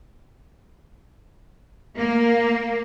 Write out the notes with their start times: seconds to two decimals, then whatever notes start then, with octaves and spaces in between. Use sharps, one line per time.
1.98 A#3